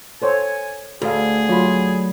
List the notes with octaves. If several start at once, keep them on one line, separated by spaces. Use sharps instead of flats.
A4 C5 C#5 G#5
D2 F#4 G#4 A4 F5
F#3 F4 B5